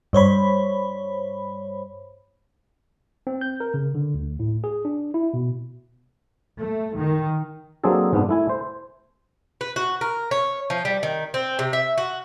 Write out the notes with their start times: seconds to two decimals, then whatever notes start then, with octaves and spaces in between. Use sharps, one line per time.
0.13 G2 C5 C#5 B5
3.27 C4
3.41 G6
3.60 A#4
3.74 C#3
3.95 D3
4.14 D2
4.39 A2
4.64 G#4
4.85 D4
5.14 E4
5.34 B2
6.60 A3
6.97 D#3
7.84 F#3 A#3 C4 D4 G#4 A4
8.13 G#2 B3 D4
8.29 A3 E4 G#5
8.49 C5
9.61 B4
9.76 F#4
10.01 A#4
10.31 C#5
10.70 F3
10.85 G3
11.03 D#3
11.34 C4
11.59 C3
11.73 E5
11.98 F#4